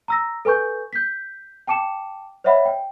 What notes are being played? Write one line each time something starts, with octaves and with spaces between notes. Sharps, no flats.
A#5 E6 A#6
A4 B4 G#5 C#6 G6
G6 B6
G5 A5 D6 C#7 E7
C5 C#5 D#5 E5 F#5 B5
G5